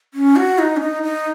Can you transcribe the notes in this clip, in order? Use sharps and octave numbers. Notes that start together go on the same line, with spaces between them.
C#4
F#4
D#4
C#4
D#4
D#4